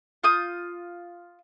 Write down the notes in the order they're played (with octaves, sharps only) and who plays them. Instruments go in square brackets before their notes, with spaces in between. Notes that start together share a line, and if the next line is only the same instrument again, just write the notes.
[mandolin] F4 D#6 G6